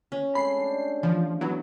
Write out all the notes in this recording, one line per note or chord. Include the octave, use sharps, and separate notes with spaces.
C#4
G#3 A3 C4 B5 C7
D4 G4
E3 F3
E3 F#3 B3 E4